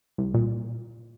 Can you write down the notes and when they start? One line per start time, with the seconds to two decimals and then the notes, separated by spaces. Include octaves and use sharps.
0.18 C2
0.34 A#2